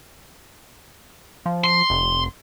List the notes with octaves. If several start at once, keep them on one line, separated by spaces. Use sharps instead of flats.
F3
C6
F1